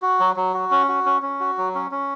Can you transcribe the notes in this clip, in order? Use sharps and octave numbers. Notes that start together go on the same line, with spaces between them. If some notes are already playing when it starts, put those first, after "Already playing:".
F#4
F#3
F#3
F#4
C#4
F#4
C#4
C#4
F#4
F#3
C#4
C#4